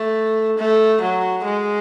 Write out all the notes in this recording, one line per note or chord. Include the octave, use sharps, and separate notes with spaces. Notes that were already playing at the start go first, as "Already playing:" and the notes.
Already playing: A3
A3
F#3
G#3